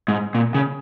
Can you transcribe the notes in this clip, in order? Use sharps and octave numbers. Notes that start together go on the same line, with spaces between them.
G#2
A#2
C#3